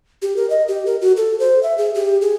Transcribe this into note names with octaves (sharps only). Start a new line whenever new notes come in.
G4
A#4
D#5
G4
A#4
F#4
A4
C5
E5
G#4
G4
G#4